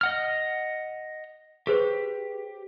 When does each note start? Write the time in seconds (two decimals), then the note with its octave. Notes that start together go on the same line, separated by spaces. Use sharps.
0.01 D#5 F#5 F6
1.67 G4 G#4 B4 C5